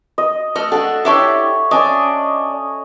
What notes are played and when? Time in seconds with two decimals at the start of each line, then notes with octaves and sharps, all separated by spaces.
0.18 D#5
0.56 A3 D#5 F6
0.72 A3 D4 F#4 A4 F#5
1.05 D4 E4 G4 C#5 E5
1.71 C#4 D4 D5 D#5